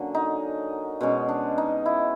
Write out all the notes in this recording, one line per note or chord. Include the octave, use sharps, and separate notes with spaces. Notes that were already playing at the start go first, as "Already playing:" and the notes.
Already playing: D3 F#3 A#3 C#4
D#4
B2 G#3 C#4
D4
D#4
E4